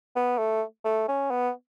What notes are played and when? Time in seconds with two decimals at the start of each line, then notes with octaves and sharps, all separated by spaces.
0.16 B3
0.38 A3
0.85 A3
1.08 C#4
1.31 B3